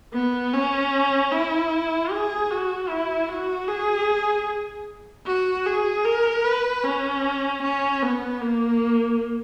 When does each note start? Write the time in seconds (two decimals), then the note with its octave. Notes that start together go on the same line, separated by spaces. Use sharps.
0.13 B3
0.53 C#4
1.32 E4
2.11 G#4
2.50 F#4
2.89 E4
3.29 F#4
3.68 G#4
5.26 F#4
5.66 G#4
6.05 A#4
6.44 B4
6.84 C#4
7.62 C#4
8.02 B3
8.41 A#3